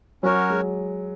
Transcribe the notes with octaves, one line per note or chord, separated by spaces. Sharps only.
F#3 C#4 F#4 A#4 C#5
G#3